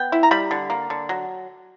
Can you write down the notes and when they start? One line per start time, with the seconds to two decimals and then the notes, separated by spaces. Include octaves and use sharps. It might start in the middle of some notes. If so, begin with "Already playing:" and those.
Already playing: B3 G5
0.12 E4
0.23 A#5
0.31 G3 B5
0.51 D3
0.70 A#3
0.90 D3
1.09 F#3